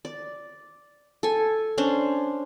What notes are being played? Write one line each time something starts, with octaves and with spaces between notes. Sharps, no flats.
D5
A4 G#5
C#4 D4 C5